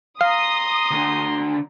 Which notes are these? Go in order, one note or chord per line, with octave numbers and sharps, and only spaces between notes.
F5 A#5 C6 D#6
D2 D3